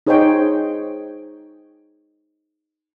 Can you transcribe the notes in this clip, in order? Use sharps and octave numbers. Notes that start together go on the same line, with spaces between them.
D#4 G#4 C5 C#5 D#5 G5